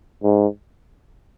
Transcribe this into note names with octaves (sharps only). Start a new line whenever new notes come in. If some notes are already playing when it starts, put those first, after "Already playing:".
G#2